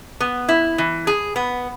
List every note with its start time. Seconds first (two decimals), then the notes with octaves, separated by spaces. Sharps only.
0.20 B3
0.49 E4
0.78 E3
1.07 G#4
1.36 B3